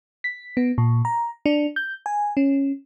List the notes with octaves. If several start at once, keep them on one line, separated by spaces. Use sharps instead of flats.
B6
B3
A#2
A#5
D4
G6
G#5
C#4